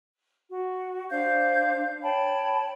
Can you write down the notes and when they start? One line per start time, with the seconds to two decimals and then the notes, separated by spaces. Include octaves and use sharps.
0.51 F#4
1.10 D4 C5 F5 G6
2.03 C#5 G5 A5 B5